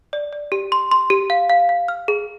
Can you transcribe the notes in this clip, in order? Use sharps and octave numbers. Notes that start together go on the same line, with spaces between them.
D5
D5
G4
C6
C6
G4
F5
F5
F5
F6
G#4